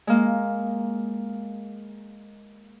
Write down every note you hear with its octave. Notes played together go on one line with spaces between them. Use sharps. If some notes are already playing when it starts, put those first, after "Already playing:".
G#3 A#3